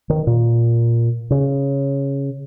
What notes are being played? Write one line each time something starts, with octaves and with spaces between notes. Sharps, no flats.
D#3
A#2
C#3